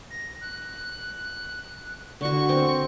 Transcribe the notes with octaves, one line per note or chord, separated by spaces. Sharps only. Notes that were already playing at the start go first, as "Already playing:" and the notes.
A#6
F#6
D3 F#4 C#6
C4